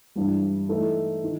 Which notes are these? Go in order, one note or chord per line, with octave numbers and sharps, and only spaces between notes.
G2 E3 G3
E3 A3 D#4 A4
D#3